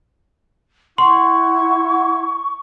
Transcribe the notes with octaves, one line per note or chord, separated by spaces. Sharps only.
E4 F#5 C6 C#6